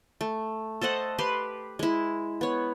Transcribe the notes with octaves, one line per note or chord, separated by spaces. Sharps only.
A3
A4 C5 D#5 F#5
G4 B4 C6
G#3 E4
B3 C#5